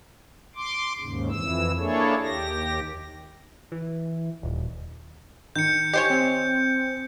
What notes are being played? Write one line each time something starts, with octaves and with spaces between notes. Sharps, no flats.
C6 D6
D#2 G#2 C#3
F2 E3 E6
A#3 D4 E4 G#4 A4 C#5
D#2 G4 A#6
E3
D#1
D#3 G6 C#7
G4 C5 C#5 D#5 G#5 G6
C4